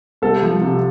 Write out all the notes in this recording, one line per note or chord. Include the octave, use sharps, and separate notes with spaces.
C2 A4
F3
C3